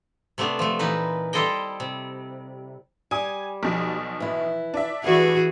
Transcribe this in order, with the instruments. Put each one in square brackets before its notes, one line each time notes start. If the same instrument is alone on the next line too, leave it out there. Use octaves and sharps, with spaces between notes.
[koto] C3 A3 B3 D4
F3 A3
A#2 E3 D#4 B4
G3 E4 A4 C5 D#5 G5
C3
[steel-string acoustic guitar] G3 [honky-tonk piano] G#5 D#6
[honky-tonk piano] B1 B2 F3
[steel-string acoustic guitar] E3 E4
[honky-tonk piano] D4 E5
[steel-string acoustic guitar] G2 B4 [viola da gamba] E3 F#4 G#4